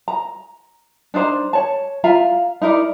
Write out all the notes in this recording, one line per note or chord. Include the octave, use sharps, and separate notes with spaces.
A#5
D4 D#4 C5 A#5
C#5 A5
F4 E5 F5 A#5
D#4 E4 A#4 D5